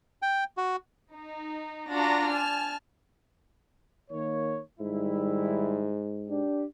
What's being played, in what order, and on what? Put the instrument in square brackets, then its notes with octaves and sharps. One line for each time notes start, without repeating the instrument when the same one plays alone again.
[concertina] G5
F#4
[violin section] D#4
D4 F4 F#4 A#5 A#6
G#5 A5 F6
[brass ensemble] D#3 A#3 C#5
[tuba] G#2 [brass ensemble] D#3 G3 E4
[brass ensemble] D4 G4